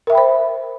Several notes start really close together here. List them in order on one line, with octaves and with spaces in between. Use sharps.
A#4 E5 G5 B5 C5